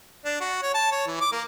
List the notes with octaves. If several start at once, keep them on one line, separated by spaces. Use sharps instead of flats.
D4
F#4
C#5
A5
C#5
E3
D6
A#3